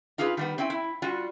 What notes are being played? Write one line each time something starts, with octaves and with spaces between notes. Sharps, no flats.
D#4 F4 G4 G#4 B4
D#3 G3 B3
C4 C#4 E4 G5
E4
G3 F4 F#4